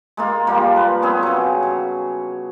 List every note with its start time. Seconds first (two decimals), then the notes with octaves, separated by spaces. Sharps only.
0.17 G#3 A#3 F4
0.47 F3 G3 A#3 F4
0.76 B4
1.02 B3 C4 G#4 C#5
1.23 C#3 F#3
1.63 F#3